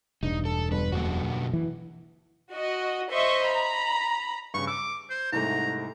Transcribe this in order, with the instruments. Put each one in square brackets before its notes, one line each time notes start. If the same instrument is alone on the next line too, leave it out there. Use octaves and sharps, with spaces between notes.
[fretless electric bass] E1 [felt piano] G2 [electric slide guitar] D#4
[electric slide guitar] A4
[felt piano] G1 [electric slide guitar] B4
[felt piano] F#1 [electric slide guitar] B2 D3 F#4
[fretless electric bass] E3
[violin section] F#4 D#5
C5 D#5 E5 C#6
A#5 B5
[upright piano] G2 C#3 [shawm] C#6
[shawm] D6 [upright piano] E6
[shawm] C5
[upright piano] C2 G#2 A3 [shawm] A#5